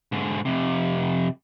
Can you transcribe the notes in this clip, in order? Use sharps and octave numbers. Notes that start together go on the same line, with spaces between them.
G#2 D3
F2 C3